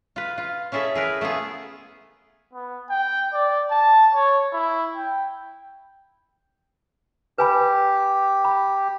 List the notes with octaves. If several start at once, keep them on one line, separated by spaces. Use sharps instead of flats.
F4 B4
F4
C#4 E4 G#4 A4 E5
G#4 A#4 B4
A3 B3 F4 G#4
B3
G5
D5
A5
C#5
E4
G5
G4 B4 G#5 B5
B5